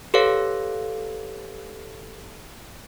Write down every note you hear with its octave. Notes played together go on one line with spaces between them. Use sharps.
G4 A4 B4 C#5 F5